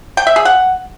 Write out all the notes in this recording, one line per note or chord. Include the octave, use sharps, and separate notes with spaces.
G5
E5
G#4
F#5